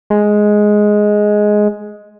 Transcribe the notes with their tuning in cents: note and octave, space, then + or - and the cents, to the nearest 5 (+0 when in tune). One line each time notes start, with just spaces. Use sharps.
G#3 +5